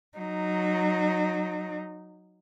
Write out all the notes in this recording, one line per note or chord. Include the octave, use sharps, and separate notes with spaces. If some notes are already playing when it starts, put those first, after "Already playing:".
F#3 D#4